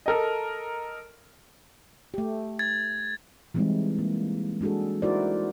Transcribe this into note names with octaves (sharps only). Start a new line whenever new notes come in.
A4 A#4 D#5
A3 G4
G#6 A6
E3 G3 G#3 C4 D#4 E4
A#3
G#3 D4 F#4 G#4 A4
D#4 E4 F#4 A#4 C5 D5